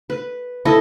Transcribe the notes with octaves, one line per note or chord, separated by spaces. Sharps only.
B4
E4 A4 D#5